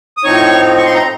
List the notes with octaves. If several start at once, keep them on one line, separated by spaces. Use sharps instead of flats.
D#6
A2 F3 C4 D#4 C#5 C#6
C#6
C6
A#5